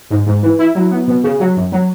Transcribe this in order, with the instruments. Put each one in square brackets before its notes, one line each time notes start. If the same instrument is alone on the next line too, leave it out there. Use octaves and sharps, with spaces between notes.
[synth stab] G#2
G#2
E3
E4
F#3
B3
B2
C#3
F#3
F#2
F#3